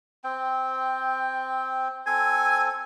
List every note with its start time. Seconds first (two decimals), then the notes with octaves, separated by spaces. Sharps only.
0.24 C4 G5
2.07 C4 A4 G#5